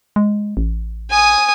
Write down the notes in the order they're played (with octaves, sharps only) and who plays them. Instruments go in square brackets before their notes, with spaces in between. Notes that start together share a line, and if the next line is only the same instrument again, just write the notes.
[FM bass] G#3
A1
[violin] G#5 D#6